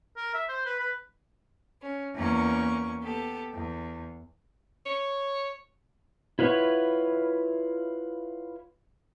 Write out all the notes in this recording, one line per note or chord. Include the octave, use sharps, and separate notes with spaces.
A#4
E5
C5
B4
B4
C#4
E2 A#3 C#4 A#4 C#6
B3 G4 A4
E2
C#5
E4 F4 B4 C#5 E5 F#5